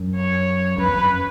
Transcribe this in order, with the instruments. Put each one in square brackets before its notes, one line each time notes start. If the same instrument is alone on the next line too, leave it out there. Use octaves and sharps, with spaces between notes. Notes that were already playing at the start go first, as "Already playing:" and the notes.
Already playing: [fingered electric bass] F#2
[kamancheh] C#5
[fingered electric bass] F#2 [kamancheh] B4
[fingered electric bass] E2
F#2